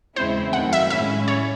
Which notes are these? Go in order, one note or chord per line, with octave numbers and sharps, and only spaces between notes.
E2 C#3 G#3 C4 E4 C5
F#2 D#3 A3 F#5
E5
A2 G#3 C#4 E4 E5
C#5